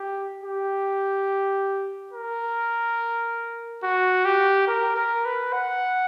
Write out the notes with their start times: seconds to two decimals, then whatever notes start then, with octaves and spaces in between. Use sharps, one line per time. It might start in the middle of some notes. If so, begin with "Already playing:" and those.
Already playing: G4
0.44 G4
2.13 A#4
3.84 F#4
4.25 G4
4.67 A#4
4.96 A#4
5.25 B4
5.53 F#5